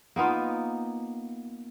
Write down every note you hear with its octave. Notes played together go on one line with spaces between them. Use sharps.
A#3 B3 D#4 F4